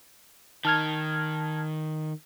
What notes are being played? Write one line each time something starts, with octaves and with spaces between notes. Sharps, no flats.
D#3 A5 F6 G#6